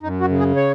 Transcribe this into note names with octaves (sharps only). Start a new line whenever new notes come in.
F#2 D#4
F#4
C#3
G#4
C#5